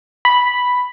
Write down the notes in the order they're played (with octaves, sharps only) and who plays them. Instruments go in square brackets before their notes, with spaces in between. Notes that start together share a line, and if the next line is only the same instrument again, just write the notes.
[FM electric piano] B5